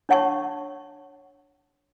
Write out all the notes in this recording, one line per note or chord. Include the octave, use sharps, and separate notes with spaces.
D4 C#5 F#5 A5 C#6